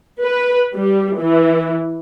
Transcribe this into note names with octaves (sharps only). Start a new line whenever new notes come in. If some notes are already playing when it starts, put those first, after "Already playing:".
B4
G3
E3